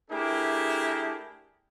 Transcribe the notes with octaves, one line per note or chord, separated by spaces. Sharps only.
A3 D4 E4 G4 G#4 A#4